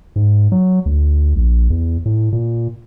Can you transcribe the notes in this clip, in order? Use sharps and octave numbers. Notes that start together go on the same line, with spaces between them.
G#2
F#3
D2
A#1
E2
A2
A#2